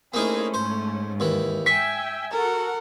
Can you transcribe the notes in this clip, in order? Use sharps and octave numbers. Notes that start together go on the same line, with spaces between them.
A3 A#3 C#4 D#4 E4 G#4 A#4 C5
G#2 C5
D#2 E3
E5 G5 G#5 C#6 B6
F#4 A4 A#4 F#5